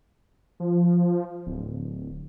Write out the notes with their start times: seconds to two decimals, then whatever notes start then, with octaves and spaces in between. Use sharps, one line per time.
0.60 F3
1.46 D1